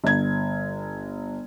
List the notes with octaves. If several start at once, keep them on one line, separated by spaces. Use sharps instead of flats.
G1 G#6